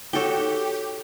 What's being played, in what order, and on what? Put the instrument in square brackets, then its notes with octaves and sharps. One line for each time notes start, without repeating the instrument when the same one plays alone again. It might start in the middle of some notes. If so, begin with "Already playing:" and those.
[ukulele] D#4 F#4 C#5 [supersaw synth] G4 [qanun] A4 G5